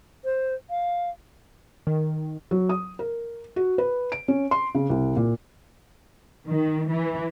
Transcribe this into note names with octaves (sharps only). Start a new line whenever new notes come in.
C5
F5
D#3
F#3
D#6
A#4
F#4
B4
D7
C#4
C6
C#3
C2
A#2
D#3
E3